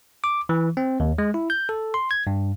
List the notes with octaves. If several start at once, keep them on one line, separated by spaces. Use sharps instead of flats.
D6
E3
C4
D#2
G#3
E4
G6
A4
C6
G#6
G2